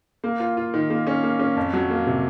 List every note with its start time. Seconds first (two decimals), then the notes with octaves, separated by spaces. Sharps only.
0.24 A#3
0.40 F4
0.57 F4
0.74 D#3
0.90 A#3
1.07 C#4
1.23 A#3
1.39 C#4
1.56 F2
1.73 F#3
1.90 A#3
2.07 C3